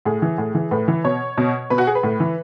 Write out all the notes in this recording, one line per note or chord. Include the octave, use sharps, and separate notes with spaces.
A2 G#4
E3
A2
E3
A2 B4
E3
B2 C#5
B2
B2 B4
F#4
G#4
B4
A2
E3